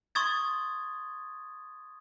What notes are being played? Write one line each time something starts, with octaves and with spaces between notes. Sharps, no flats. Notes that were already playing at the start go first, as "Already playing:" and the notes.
C6 C#6 D#6 G#6 A6